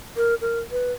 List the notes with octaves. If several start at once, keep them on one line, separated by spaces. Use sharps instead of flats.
A#4
A#4
B4